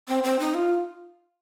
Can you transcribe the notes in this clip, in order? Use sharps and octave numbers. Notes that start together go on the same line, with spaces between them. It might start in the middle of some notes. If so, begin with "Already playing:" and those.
C4
C4
D#4
F4